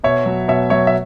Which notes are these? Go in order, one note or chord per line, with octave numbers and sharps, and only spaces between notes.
B2 C#5 E5
F#3
B2 C#5 E5
F#3 C#5 E5
E5